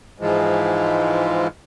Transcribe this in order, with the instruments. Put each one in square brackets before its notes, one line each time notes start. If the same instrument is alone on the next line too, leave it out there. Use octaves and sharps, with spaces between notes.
[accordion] G#2 E3 F3 G#3